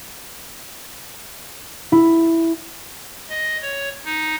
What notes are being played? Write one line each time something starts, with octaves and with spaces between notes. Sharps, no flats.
E4
D#5
C#5
D#4